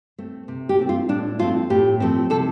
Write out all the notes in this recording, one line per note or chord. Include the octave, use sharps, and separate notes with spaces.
A3 C4
C3
G4
A3 C4
F4
A2 D4
F3 A3 C4 F4
A2 G4
F3 A3 C4
C3 A4